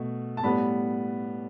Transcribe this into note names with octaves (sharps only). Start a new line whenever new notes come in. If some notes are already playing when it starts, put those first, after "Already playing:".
Already playing: B2 A3
A5
A2 G3 B3 B5